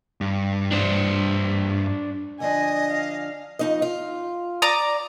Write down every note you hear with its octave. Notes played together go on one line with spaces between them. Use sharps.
G2
D4 C5
D3 F3 D4 D#5 G#5
F5
F2 D#4 D#5
F4
D5 A#5 D#6